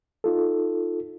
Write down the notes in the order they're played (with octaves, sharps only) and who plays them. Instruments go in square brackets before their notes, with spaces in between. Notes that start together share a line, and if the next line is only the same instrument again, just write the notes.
[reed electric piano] D#4 F4 A4